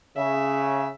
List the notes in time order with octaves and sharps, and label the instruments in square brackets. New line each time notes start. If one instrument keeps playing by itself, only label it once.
[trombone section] C#3 [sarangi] E5